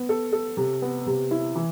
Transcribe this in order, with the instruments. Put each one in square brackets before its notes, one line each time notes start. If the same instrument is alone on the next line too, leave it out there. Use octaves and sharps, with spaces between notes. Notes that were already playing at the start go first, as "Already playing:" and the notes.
Already playing: [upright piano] B3
A4
A4
C3
B3
C3
E4
E3